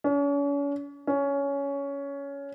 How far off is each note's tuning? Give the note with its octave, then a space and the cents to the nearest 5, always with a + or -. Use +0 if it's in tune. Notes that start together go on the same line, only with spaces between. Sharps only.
C#4 +40
C#4 +15